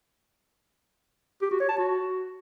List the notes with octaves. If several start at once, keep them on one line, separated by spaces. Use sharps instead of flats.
G4
F#4
C#5
A5
F#4